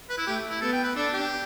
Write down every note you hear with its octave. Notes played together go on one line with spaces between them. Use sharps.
B4
E4
A3 G4
E4
B3 A4
G5
B4
D4 A4
G4